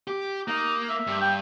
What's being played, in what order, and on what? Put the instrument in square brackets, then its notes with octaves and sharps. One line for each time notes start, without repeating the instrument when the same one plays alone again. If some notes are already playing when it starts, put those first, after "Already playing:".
[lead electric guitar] G4
[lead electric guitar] A#3 [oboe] D#4
[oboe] E5
[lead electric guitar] G2
[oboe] G5